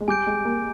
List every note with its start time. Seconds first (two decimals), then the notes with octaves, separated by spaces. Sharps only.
0.01 G#3
0.08 G3 G#5 D6 G6 D7
0.27 G#3
0.45 A#3